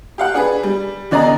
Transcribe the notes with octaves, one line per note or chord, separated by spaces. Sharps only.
G4 F5 F#5
D4 G#4 B4
G3
E2 D3 D5 D#5 A#5